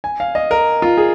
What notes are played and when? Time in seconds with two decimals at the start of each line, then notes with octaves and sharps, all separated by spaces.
0.04 G#5
0.20 F5
0.35 D#5
0.51 A#4
0.82 F4
0.97 G#4